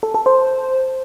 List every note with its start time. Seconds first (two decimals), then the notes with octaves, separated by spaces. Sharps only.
0.03 A4
0.14 A4
0.26 C5